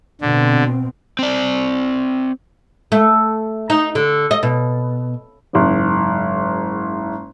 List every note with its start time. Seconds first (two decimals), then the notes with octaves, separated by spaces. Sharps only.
0.21 B2 D3 C4
1.19 C4 D5
2.92 A3
3.70 D#4
3.95 D3
4.31 D#5
4.43 B2
5.53 F#1 G#2